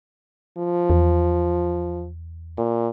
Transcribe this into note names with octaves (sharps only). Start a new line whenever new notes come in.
F3
E2
A#2